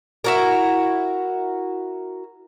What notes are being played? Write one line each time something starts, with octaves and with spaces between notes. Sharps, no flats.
E4 F#4 A#4